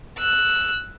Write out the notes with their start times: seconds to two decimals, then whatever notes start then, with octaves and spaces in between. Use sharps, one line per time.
0.19 E6 F#6